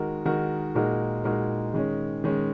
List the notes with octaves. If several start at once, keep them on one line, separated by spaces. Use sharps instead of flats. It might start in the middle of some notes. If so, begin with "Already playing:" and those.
Already playing: D#3 G#3 F#4 A#4
D#3 G#3 F#4 A#4
A#2 G#3 D#4 F#4 A#4
A#2 G#3 D#4 F#4 A#4
D#3 G#3 C#4
D#3 G#3 C#4